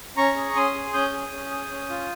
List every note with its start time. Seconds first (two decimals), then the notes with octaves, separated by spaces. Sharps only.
0.17 C#4 A#5 C#6
0.36 G#4
0.55 C#4 C6 D#6
0.75 G#4
0.94 C#4 D#6 G6
1.13 G#4
1.32 C#4
1.51 G#4
1.70 C#4
1.89 F4